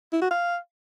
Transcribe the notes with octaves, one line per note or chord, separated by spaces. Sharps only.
E4
F#4
F5